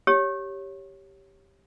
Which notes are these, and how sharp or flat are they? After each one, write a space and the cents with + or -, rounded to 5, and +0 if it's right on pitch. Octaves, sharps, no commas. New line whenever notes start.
G4 +0 C#5 +0